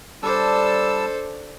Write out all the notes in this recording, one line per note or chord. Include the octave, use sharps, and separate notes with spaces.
G3 D4 A4 C5 D5 A5 E6